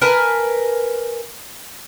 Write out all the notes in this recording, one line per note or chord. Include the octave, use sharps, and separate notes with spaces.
A#4 B4 G#5 A5